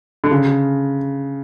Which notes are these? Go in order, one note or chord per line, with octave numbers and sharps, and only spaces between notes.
D3
C#3